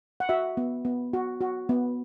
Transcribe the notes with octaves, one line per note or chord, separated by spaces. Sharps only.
F#5
F#4 E5
B3
B3
F#4
F#4
B3